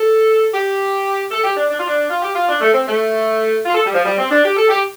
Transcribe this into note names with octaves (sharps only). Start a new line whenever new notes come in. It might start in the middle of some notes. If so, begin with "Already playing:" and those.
Already playing: A4
G4
A4
G4
D4
D4
F4
D4
F4
G4
F4
D4
A3
C4
A3
F4
A4
G3
F3
G3
C4
D4
G4
A4
G4